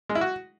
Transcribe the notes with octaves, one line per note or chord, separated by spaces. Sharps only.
G#3
E4
F#4